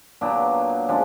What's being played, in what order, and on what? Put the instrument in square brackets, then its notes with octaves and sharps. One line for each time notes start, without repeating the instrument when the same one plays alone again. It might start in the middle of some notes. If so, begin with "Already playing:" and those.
[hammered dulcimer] A#2 F#3 B3 D4
C3 F3 G#3 C#4 D4